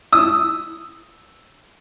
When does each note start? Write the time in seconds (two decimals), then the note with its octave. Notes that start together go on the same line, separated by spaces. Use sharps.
0.12 D#6 E6